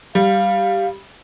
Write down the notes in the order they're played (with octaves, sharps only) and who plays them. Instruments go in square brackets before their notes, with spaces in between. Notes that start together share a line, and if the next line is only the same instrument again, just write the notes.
[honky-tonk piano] G3 [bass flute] F5